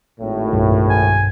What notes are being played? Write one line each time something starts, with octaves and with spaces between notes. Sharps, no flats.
G#1 A2
B1 G2
G#5